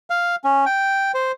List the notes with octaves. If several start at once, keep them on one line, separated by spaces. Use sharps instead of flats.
F5
C#4
G5
C5